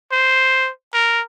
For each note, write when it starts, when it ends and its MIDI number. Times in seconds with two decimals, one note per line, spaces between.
0.12 0.70 72
0.94 1.21 70